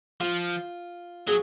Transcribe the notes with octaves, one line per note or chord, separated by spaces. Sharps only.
F3 F4
F#3 G#4